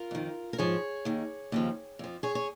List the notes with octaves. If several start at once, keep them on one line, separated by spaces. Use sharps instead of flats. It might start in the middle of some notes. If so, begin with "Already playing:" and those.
Already playing: F4 A#4
F2 D#3
A#4
G#2 F3 G#4 C#5
D#2 D#3
D#2 C#3 F3
F2 F3
G#4 C#5
C#5